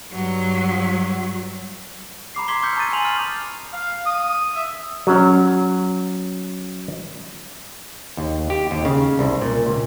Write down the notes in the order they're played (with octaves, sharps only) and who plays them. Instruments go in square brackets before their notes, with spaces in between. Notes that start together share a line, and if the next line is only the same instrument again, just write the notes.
[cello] G2 F#3
[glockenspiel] A#5 B5 D6 C7
C6 D6 G#6 B6 C7 G7
C#6 D6 E6 F6 G6 C#7
A5 A#5 D#6 A6 D#7
G#5 A#5 C6 D#6 F7 F#7
F6
[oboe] F5
D#6
E5
[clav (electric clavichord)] F#3 C#4
D#2
G4
D#2
C#3
C2
A#2
C#2